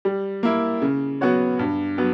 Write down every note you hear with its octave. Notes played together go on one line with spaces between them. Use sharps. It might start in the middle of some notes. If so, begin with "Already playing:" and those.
G3
A#3 E4
C#3
F#3 B3 F#4 C#5
G2
F#3 B3